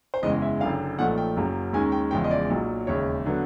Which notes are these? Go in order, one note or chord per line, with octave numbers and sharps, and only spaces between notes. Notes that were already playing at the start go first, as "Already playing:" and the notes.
C5
F#1 E2 C#3 E3 G#3 D#5
E5
F#1 F#2 D3 F5
B1 A#2 F3 A3 F#5
G5
F#1 F#2 C#3 F#3 A#3
D#2 D#3 G#3 C#4 G#5
G5
E1 E2 C#3 F3 G#3 G5
D#5
D5
B1 A#2 F#3
E1 D#2 C#3 C#5
D3 F#3 B3